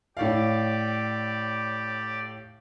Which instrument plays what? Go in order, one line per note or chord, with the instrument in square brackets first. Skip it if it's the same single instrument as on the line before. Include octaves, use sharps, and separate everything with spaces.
[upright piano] A2 C#5 F5 [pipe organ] G4 D5